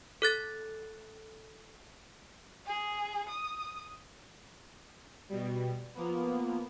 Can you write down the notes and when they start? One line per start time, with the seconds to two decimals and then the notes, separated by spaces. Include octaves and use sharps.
0.22 A4 F#6 A6
2.66 G#4
3.29 D#6
5.29 B2 G3
5.95 F3 A#3 B3